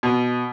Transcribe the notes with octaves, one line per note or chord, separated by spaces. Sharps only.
B2